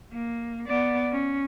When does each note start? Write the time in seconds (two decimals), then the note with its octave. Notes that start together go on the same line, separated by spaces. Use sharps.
0.13 A#3
0.67 B3 D5
1.12 C#4